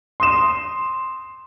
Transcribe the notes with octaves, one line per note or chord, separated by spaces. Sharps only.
C6 D#6 E7